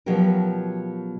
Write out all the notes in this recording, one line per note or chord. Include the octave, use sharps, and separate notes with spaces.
B2 F3 F#3 C#4 G4 A#4